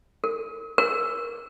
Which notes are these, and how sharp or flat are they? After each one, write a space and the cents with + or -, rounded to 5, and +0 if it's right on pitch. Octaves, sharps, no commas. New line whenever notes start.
A#4 -40
A#4 +15